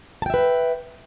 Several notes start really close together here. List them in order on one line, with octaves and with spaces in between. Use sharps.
A5 G5 E5 B4